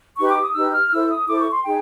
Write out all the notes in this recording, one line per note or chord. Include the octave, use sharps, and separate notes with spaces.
D#4 G4 B4 C#6
D6
D#6
D#4 G4 B4 E6
F6
E4 A4 C5 E6
D#6
E4 A4 C5 D6
C#6
C6
D#4 G#4 G5